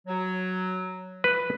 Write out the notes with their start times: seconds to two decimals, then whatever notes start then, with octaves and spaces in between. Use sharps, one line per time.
0.07 F#3
1.24 B4